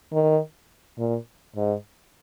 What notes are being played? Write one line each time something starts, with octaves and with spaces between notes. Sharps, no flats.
D#3
A#2
G#2